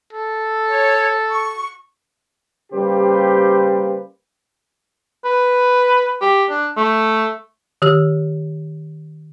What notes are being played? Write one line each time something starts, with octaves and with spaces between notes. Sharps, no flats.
A4
C#5
C#6
C#3 G3 A#3 G4 B4 C5
B4
G4
D4
A3
D#3 G4 E6